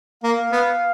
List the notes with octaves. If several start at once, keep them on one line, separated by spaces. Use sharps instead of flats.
A#3 F5
B3